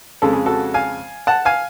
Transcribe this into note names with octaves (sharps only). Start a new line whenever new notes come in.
F2 C#3 G#3 A4
G#4
F#4 A4
F5 G#5
F#5 A5
F5 G#5